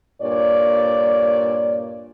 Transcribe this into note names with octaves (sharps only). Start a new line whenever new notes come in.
G2 A#2 C#5 D5